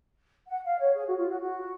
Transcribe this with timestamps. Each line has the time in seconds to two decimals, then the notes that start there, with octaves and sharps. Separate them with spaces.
0.49 F#5
0.64 F5
0.80 C#5
0.94 G#4
1.06 F#4
1.18 F4
1.29 F#4
1.41 F#4